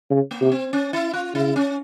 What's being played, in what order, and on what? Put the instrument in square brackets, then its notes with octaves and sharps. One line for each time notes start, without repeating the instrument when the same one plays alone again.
[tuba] C#3
[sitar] A#3
[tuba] C3
[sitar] C4
C#4
E4
F4
[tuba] C#3 [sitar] E4
[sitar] C#4